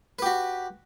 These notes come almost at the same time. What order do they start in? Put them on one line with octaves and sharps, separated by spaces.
B4 G4 F#4